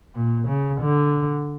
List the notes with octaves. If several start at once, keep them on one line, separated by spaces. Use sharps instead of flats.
A#2
C#3
D3